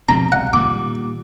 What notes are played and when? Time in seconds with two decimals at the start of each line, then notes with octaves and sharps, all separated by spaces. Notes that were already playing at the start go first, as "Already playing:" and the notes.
0.09 B2 F3 C4 A#5
0.32 C2 F#5
0.53 A#2 D#3 G3 D6